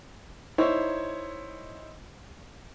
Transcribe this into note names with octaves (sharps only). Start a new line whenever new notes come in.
D#4 E4 C5 C#5